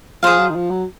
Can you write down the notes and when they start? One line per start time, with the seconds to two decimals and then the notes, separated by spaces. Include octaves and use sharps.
0.23 F3 G#4 C5 F5
0.39 F#3
0.50 D#3
0.55 F3
0.70 F#3